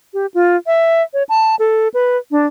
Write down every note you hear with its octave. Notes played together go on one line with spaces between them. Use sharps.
G4
F4
E5
C#5
A5
A4
B4
D4